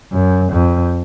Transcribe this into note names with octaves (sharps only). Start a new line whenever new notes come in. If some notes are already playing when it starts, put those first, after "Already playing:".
F#2
F2